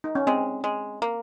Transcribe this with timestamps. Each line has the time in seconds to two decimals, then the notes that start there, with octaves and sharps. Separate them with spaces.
0.04 D#4
0.15 C#4
0.27 G#3 C4
0.64 G#3
1.02 A#3